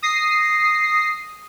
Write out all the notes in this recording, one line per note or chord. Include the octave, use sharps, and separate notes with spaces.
D#6 A#6 C7